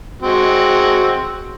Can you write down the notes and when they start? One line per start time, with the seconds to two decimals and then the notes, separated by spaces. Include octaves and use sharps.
0.22 G#3 C4 F#4